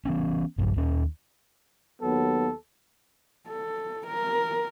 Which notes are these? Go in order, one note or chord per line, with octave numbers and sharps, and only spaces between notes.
E3 B3 C#4
A#1 G2 F3
D#2 C#4
D#2 F#3 B3 A4
A4
A#4